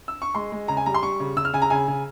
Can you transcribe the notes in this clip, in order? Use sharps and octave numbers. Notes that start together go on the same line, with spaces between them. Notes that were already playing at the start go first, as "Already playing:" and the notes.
E6
C#6
G#3 C6
G#3
C#3 A#5
G#5
G3 A#5
C6
G3 C#6
C#3
C#3 E6
F6
C#3 G#5
A#5
C#3 G#5
C#3